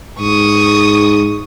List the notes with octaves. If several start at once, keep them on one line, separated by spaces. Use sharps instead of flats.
G#2 C#6 D#6